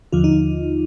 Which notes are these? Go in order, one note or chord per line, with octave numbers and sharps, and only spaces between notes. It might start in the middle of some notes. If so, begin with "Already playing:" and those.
D#2 D3 F3 F4
D#4